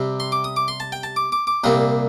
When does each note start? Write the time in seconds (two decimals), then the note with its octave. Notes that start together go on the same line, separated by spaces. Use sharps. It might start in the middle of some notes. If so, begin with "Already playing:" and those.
Already playing: C3 G3 C4
0.20 C6
0.32 D6
0.44 D#6
0.56 D6
0.68 C6
0.80 A5
0.92 G5
1.03 A5
1.16 D6
1.32 D6
1.47 D6
1.64 C2 A#2 G3 C4 D#6